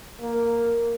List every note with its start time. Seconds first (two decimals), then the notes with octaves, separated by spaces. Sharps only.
0.20 A#3